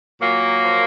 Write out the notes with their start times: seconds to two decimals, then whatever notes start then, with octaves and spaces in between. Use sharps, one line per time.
0.20 A#2 F#3 A#3
0.62 F3